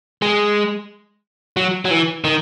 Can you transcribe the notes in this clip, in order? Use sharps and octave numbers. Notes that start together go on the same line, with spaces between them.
G#3
F#3
F#3
E3
D#3